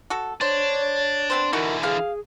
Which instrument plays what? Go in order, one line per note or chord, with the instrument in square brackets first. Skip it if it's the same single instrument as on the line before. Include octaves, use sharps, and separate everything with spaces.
[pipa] F#4 A4
[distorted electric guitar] D4 [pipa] C5 [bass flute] C#5
[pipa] B3 C4 C5
[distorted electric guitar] D3 E3 [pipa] D#4 E4 F#4 [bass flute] A#4
[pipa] B2 F5 [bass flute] G#4